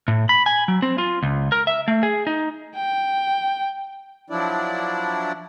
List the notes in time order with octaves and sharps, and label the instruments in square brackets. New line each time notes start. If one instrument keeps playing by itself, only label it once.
[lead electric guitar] A2
B5
G#5
F#3
C4
F4
C#2
A#4
E5
A3
G#4
D#4
[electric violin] G5
[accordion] F3 F#3 D4 E4 D5